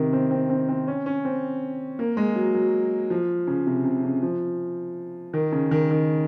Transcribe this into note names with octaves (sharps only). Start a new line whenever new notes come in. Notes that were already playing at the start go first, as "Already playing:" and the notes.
Already playing: C3 D#3
C4
C4
C4
C4
C#4
C#4
C4
A#3
G#3
F#3
F#3
F3
C#3
C3
C3
C#3
F3
D#3
C#3
D#3
D#3